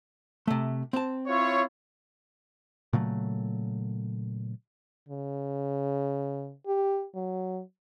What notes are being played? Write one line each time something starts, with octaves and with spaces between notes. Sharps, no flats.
C3 A3
C4 A5
E4 F4 C#5
A#2 C#3 F#3 A3
C#3
G4
F#3